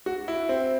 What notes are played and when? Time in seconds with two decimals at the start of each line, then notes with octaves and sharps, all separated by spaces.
0.06 F#4
0.28 E4
0.49 C4